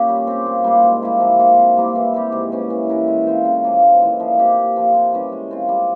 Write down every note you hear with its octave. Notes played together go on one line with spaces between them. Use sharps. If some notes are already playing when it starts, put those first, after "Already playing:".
Already playing: A#2 C#4 G4
G3
C4 G4
A#2
G3 A#3 F4
G#2
G3 A#3 E4
F3
A#3 F4
C3
G3 A#3 E4
E3
G3 C4 G4
G#2
E3 G3 C#4
E3
G#3 E4 A#4
G#3
C4 F4 C5
C#3
F3 A#3 F4
G#2
E3 G#3 E4
F3
C4 G4
A#2
F3 C4 F4
C3
E3 G3 C#4
G#3
C4 F4
G3